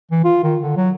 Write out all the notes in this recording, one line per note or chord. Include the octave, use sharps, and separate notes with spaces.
E3
F4
D#3
D3
F#3